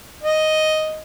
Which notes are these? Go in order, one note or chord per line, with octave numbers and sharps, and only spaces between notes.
D#5